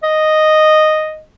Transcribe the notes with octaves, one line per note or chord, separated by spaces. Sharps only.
D#5